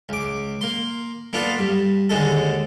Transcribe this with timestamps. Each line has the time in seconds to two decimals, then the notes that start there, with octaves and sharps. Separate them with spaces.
0.09 C#2 D6
0.61 A#3 C6
1.33 A#3 B3 D4 F4 A4
1.59 G2
2.09 D#2 D3 G#3 A4